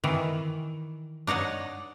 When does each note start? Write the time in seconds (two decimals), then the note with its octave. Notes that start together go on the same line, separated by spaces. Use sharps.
0.04 D#3 E3
1.27 D4 D#4 C#5 F#5